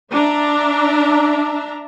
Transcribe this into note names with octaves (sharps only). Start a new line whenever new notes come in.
D4 E5 A#5